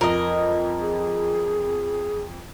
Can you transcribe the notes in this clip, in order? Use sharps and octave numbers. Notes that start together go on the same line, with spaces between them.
F2 A#4 D#5
G#4